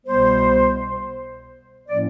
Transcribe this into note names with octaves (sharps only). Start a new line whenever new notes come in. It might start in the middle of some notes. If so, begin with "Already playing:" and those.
C2 B2 G3 B3 C5
A2 F3 A#3 C#4 D5